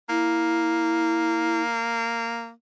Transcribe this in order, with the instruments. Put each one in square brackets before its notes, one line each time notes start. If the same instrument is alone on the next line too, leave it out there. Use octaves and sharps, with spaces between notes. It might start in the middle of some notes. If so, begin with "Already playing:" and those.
[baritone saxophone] A#3 [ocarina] E4